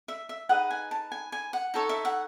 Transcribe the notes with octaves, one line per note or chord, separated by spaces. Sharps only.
E5
E5
D#4 G#4 B4 D#5 F#5
G#5
A5
G#5
G#5
F#5
D#4 A4 C#5
E5
F#5